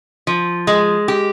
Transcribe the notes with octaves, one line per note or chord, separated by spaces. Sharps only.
F3
G#3
G4